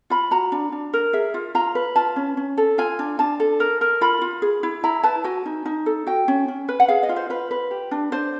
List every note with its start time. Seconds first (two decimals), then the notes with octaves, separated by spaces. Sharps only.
0.10 F4 B5
0.31 F#4 A#5
0.52 D4
0.72 D4
0.93 A#4
1.13 G#4 E5
1.34 F4
1.55 F4 A#5
1.75 B4
1.96 F4 A5
2.16 C#4
2.37 C#4
2.57 A4
2.78 F4 G#5
2.99 D4
3.19 D4 A5
3.40 A4
3.60 A#4
3.81 A#4
4.01 F4 B5
4.22 F4
4.42 G#4
4.63 E4
4.84 E4 A#5
5.03 B4 A5
5.24 F#4 G#5
5.46 D#4
5.66 D#4
5.86 A4
6.07 F#4 G5
6.28 C#4
6.48 C#4
6.69 B4
6.80 F#5
6.88 G#4 F5
7.03 D#5
7.09 F4
7.16 C5
7.30 F4 B4
7.51 B4
7.71 G4
7.91 D4
8.12 D4 C5